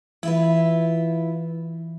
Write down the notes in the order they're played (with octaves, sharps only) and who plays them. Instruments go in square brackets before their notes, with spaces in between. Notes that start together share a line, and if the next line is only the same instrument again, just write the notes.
[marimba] E3 [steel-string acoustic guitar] E4 F4 B4